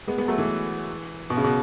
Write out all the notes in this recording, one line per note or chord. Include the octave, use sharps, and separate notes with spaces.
G#3 B3
G#3 B3
F#3 A3
E3 G#3
B2
C#3
B2